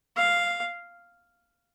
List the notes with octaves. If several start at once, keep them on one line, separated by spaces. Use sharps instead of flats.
F5